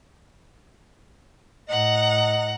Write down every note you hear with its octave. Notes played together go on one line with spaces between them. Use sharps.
A2 D#5 F#5 A#5